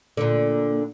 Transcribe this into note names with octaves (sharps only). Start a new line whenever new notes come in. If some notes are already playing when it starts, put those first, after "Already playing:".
A#2 D3